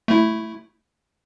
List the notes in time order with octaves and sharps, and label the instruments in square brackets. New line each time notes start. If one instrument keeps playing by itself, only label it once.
[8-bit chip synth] A3 E4